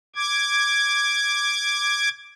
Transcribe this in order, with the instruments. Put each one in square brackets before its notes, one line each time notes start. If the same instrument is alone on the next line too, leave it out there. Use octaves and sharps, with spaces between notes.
[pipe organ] D6 G#6